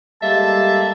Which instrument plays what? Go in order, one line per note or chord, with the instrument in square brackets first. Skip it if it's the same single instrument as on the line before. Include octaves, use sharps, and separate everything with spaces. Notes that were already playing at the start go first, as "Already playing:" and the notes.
[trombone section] G3 [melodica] G#3 A#3 A4 [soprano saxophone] E5 [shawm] A5